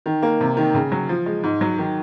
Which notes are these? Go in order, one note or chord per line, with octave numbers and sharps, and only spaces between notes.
D#3
A#3
C3
D#3
C#3
F#3
F3
G#3
G#2
F#3
D#3